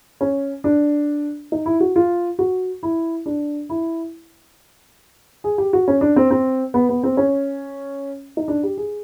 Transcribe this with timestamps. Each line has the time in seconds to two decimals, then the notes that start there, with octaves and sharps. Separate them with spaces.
0.21 C#4
0.64 D4
1.52 D#4
1.66 E4
1.80 F#4
1.96 F4
2.39 F#4
2.83 E4
3.26 D4
3.69 E4
5.44 G#4
5.58 G4
5.73 F#4
5.88 C#4
6.01 D4
6.16 C4
6.31 C4
6.74 B3
6.89 B3
7.03 C4
7.17 C#4
8.37 D#4
8.48 D4
8.63 G4
8.77 G#4